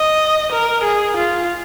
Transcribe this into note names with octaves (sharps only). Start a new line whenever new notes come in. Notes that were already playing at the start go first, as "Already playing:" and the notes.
Already playing: D#5
A#4
G#4
F4